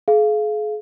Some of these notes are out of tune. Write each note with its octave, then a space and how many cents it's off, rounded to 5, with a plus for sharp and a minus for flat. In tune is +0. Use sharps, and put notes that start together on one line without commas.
G#4 +40 F5 -15